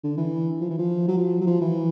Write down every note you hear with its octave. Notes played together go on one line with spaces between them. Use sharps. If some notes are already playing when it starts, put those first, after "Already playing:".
D3
E3
F3
E3
F3
F#3
F3
F#3
F3
E3